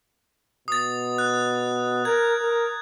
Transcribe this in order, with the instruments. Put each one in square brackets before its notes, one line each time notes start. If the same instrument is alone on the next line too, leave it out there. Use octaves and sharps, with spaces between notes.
[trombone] B2 [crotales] D#6 A6
[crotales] F#6
[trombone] A#4 [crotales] G#6
[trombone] A#4